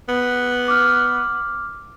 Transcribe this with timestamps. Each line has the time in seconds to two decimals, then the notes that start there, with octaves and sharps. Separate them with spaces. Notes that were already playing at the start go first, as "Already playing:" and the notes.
0.09 B3
0.68 D6 F6